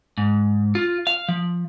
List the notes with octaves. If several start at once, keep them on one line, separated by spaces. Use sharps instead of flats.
G#2
F4
F5
F3